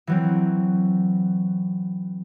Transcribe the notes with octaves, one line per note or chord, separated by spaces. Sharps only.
E3 F#3 C4